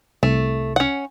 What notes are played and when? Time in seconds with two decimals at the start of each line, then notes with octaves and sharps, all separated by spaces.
0.23 C2 A3
0.76 C#4 F#5